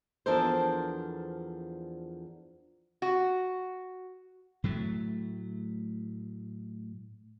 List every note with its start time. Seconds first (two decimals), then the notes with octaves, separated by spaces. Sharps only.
0.26 E2 F3 D4 A4 A#4 C5
3.02 F#4
4.64 A2 F#3 A3